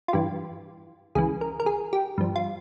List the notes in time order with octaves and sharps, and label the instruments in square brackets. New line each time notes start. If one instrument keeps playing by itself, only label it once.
[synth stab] F4
G2 E3 G4
C#2 C#3 E3 G#4
A#4
A#4
G#4
G4
G2 F3
F4